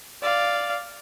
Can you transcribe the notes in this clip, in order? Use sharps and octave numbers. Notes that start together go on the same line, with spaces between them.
D5 F5